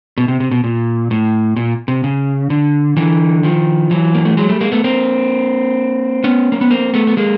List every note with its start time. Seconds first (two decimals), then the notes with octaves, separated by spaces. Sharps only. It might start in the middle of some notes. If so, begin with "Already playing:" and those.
0.18 B2
0.28 C3
0.40 C3
0.51 B2
0.64 A#2
1.11 A2
1.56 A#2
1.88 C3
2.04 C#3
2.50 D3
2.97 D3 E3
3.43 D#3 F3
3.91 E3 F#3
4.15 A#3
4.25 A3
4.37 F#3 G#3
4.49 G3 A3
4.60 G#3 A#3
4.72 A3 B3
4.84 A#3 C4
6.24 B3 C#4
6.52 A#3
6.61 B3
6.71 A#3 C4
6.94 A3 B3
7.07 B3
7.17 G#3 A#3